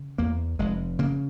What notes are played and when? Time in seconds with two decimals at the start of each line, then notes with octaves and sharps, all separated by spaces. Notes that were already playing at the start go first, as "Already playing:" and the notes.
Already playing: C#3
0.18 E2 A#3
0.59 F1 G#3
0.99 C#3 A#3